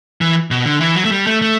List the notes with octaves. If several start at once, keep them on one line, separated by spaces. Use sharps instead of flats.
E3
B2
D3
E3
F#3
A3
G3
A3
A3